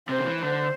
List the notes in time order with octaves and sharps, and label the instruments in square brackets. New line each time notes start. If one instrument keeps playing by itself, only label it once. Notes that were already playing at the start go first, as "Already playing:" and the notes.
[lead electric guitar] C3 [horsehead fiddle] C5
[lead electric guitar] D3
E3
[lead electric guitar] D3 [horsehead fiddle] C5